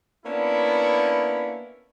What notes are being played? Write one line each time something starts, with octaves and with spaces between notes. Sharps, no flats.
A#3 B3 C#4 D4 E4